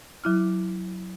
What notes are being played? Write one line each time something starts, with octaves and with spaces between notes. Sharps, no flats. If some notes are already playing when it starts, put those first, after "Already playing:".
F#3 E4 F6